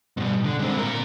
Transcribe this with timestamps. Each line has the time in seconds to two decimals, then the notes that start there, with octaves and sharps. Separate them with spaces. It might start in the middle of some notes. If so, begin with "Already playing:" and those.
0.17 G2 B2
0.44 D3
0.59 G#3 C4
0.78 A#2 A#4